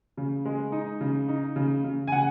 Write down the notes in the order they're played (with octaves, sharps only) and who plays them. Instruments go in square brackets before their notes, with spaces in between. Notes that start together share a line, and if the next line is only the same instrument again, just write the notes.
[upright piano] C#3
G#3
D#4
C#3
D#4
C#3
C#3
G#5
C#3 F#5